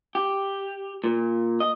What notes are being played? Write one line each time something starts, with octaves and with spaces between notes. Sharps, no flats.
G4
A#2
D#5